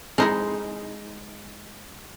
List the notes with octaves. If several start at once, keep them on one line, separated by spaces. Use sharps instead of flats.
G#3 C4 D#4 E4